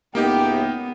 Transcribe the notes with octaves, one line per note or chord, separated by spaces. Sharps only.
C#2 A2 A#3 B3 D#4 G4 G5